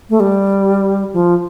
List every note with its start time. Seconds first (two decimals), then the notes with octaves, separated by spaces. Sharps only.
0.10 A3
0.20 G3
1.13 F3